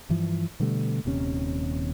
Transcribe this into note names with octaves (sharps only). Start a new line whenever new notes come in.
G2 E3 F3
B2 D3 G3 A3
D#1 D#2 C3 C#4